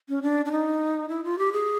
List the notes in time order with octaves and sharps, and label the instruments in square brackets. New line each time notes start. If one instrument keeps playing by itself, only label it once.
[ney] C#4
D4
D4
D#4
E4
F4
G4
G#4